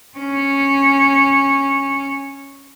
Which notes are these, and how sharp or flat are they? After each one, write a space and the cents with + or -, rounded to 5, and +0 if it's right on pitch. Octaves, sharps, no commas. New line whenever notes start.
C#4 -10